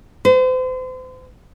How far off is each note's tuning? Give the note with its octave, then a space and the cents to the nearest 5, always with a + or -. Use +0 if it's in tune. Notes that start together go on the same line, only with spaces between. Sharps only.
C5 -40